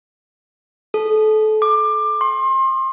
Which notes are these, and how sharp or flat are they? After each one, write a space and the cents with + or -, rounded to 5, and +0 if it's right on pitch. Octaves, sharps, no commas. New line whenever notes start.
A4 -30
D6 +20
C6 +30